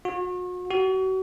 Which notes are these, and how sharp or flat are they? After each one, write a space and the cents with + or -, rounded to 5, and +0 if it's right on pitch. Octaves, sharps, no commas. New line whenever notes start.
F#4 -40
F#4 +35